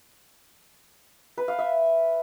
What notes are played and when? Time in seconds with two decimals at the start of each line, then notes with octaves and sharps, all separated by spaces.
1.38 B4
1.48 F5
1.59 E5